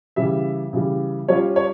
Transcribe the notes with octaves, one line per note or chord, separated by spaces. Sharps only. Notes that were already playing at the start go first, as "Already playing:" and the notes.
C#3 E3 G3 E5
C#3 E3 G3
G3 C#4 F4 C#5
C#5